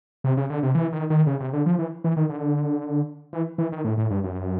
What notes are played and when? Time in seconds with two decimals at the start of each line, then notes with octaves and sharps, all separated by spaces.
0.24 C3
0.37 C#3
0.50 D3
0.63 C3
0.75 E3
0.93 D#3
1.10 D#3
1.27 C#3
1.40 C3
1.53 D3
1.66 F3
1.79 E3
2.04 E3
2.17 D#3
2.29 D3
3.33 E3
3.58 E3
3.72 D#3
3.84 A2
3.98 A2
4.11 G2
4.24 F#2